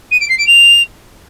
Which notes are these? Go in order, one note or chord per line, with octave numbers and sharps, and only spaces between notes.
D#7
D7
C7
D7
F7